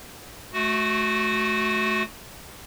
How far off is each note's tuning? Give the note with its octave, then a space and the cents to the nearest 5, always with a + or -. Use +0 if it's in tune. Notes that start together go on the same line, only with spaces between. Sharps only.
A3 -20 F#4 +0